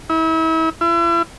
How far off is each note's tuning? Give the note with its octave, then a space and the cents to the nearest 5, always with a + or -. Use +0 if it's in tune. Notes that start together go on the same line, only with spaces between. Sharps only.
E4 -35
E4 +40